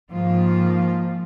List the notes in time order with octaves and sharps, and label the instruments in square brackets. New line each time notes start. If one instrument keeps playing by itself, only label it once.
[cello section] G#2 D#3 A#3 F4 [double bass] F3